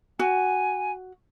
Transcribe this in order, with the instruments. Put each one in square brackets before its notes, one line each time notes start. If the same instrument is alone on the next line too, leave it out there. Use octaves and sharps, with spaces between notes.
[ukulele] F#4 [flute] G#5